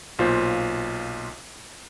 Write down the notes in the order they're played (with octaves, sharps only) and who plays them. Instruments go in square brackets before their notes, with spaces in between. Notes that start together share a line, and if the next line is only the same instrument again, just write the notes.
[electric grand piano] B1 A#2 F4 C5